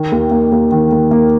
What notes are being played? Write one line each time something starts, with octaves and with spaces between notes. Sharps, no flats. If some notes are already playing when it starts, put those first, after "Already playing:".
Already playing: D#3
D#2
A#3
D#2
D#3
D#2
A#3